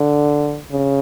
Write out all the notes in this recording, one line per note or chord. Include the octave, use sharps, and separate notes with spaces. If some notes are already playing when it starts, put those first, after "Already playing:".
Already playing: D3
C#3